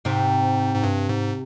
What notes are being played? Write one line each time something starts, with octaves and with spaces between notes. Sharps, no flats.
G#2 C3 C4
G#2
G2
G#2